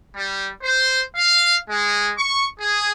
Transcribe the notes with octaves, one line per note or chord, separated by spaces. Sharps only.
G3
C5
F5
G#3
C#6
G#4